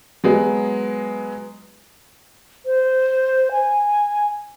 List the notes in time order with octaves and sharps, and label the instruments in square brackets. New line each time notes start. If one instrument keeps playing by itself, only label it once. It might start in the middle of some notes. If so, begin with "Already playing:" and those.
[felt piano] F#3 G#3 B3
[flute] C5
G#5